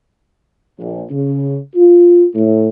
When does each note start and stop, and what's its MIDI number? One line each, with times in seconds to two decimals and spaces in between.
0.79 1.02 34
1.12 1.57 49
1.75 2.25 65
2.35 2.69 45